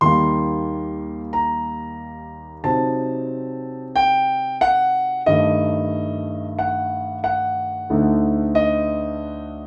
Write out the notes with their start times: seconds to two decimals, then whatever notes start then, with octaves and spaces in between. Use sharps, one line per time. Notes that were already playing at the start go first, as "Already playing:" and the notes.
0.01 D#2 D#3 G3 A#3 C6
1.33 A#5
2.64 C3 F#3 C4 D#4 A5
3.96 G5
4.61 F#5
5.26 G2 D#3 A3 D#5
6.59 F#5
7.24 F#5
7.90 D2 D3 A3 D#4
8.55 D#5